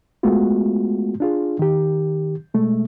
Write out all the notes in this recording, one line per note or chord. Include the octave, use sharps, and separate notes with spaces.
G#3 A3 B3 F4 F#4
D4 F4 G#4
D#3 G4
B2 G#3 A3